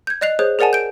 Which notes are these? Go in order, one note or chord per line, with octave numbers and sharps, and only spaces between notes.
G6 G#6
D5 D#5 F#6 C7 F7
G#4 C5 C#5 F#6
G#4 A#4 D5 F#5 G#5 A5
G6 D7